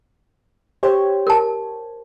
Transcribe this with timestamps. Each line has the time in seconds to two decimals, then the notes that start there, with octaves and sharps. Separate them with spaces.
0.83 G4 C5 C#5
1.27 A#4 A5